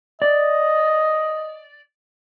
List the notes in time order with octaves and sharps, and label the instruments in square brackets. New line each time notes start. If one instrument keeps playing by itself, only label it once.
[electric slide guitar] D5 [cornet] D#5